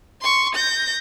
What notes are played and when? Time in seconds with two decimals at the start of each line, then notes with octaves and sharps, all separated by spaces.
0.21 C6 C#6
0.55 G6 A#6